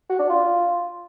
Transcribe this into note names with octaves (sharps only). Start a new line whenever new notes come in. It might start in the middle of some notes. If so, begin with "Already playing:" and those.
F#4
D4
F4